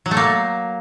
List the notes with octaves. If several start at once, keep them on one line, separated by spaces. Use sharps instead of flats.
F#3
A3
A#3